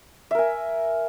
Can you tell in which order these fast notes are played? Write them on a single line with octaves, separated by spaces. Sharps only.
E5 A#4 G#5